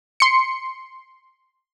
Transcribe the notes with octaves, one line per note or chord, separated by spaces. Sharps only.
C6 C#7